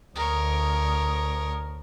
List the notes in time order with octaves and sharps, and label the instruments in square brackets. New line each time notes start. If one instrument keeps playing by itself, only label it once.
[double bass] D2 [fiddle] A#4 C#5 [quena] D#6